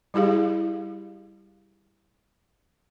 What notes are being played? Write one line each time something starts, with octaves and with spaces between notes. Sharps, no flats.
G3 E4 G4 G#4 F5